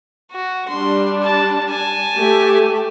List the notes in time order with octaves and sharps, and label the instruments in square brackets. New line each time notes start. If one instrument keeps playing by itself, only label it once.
[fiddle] F#4
[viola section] G3 D4 [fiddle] C6
[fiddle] A5
G#5 A5
[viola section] A3 G4 A4